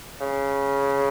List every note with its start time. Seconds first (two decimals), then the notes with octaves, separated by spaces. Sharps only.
0.20 C#3